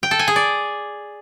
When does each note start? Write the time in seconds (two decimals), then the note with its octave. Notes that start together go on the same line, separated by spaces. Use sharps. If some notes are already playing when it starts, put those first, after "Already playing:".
0.03 G5
0.11 A4
0.19 G#5
0.28 G#4
0.36 D5